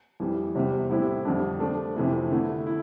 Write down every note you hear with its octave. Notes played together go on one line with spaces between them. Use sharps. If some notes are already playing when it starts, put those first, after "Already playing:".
F2 E3 G3
E2 C3 E3 G3
A2 G3 C4 E4 G4
F2 D3 G3 D4
F3 A3 D4
F2 C3 E3 A3
D3 A3 E4
E4